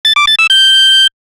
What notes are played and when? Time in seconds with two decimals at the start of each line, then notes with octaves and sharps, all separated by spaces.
0.05 A6
0.16 D6
0.27 A6
0.39 E6
0.50 G6